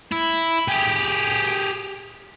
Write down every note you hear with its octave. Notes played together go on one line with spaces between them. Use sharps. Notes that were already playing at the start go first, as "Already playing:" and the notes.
E4
G4 G#4